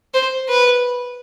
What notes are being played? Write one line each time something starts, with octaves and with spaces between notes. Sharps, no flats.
C5
B4